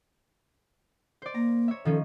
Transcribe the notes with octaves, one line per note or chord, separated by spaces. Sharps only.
C5 D5
A#3 A#5
C#5 E5
D#3 F3 C#4 A4